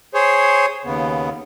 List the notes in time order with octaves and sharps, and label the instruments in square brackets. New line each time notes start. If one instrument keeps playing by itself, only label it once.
[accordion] G#4 C5 C#5
D#2 C#3 B3